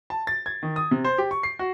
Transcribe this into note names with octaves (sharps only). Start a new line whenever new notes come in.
A5
A6
G#6
D#3
D#6
C3
C5
G4
C#6
C7
F#4